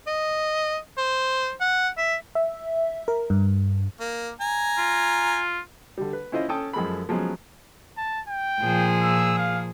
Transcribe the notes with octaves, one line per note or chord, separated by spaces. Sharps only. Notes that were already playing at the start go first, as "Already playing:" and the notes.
D#5
C5
F#5
E5
E5
A#4
G2
A#3
G#5 A#5
F4
D3 G3
B4
C#4 E4 F4 C5 D#5
C#4 A4 G5 A5 D#6
F#2 F3 G#3 A4 B5
F3 F#3 G#3 B3 C#4
A5
G5
A#2 F3 G#4
E6
F5